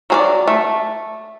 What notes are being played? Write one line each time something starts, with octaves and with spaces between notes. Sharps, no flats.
F#3 G#4 D5
A3